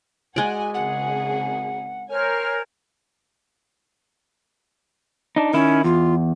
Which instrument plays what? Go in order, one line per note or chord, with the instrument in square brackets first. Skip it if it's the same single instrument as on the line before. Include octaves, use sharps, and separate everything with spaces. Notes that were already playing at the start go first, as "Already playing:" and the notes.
[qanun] G#3 D5 [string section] F#4 F#5 G#5
[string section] G#1 C#3 G#4 [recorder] F#5
[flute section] A#4 C5 C#5 [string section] G#5 F6
[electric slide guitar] D4 D#4
[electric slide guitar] D#3 E4 [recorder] C#4
[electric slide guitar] E2 [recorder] F4